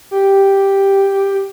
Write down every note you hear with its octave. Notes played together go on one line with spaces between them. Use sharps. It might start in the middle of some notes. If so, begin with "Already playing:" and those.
G4